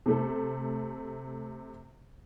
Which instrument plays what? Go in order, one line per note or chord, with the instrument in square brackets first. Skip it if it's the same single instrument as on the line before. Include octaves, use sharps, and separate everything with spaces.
[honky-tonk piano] C3 A3 A4